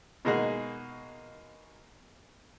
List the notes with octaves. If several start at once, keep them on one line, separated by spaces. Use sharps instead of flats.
B2 G#3 A#3 D#4 F#4 G#4